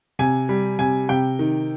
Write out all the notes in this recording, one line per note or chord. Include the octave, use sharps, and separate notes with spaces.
C3 G#5
G3
C3 G#5
C3 G5
D#3